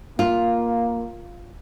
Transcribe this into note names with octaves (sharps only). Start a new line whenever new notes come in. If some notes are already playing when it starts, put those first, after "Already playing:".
A#3 F4